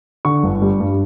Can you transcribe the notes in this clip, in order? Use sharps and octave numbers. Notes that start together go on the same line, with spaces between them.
D3 C#6
G1
G3
G2